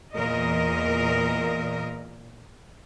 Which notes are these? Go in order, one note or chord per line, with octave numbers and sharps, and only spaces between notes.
E2 A#2 A#4 D#5